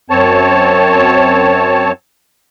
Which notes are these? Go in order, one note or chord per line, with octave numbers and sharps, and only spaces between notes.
F#2 C4 C#5 A5